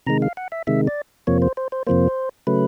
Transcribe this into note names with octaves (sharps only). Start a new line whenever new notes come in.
C3 D#3 G#3 A#5
F5
F#5
E5
C3 D#3 G#3 E5
D5
F2 C3 F3 A#3 C#5
C5
C5
C5
F2 C3 F3 A#3 C5
C#3 F#3 A3 B4